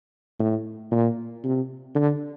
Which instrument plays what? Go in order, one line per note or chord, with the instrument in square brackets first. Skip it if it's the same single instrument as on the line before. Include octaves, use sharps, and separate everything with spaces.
[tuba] A2
A#2
C3
D3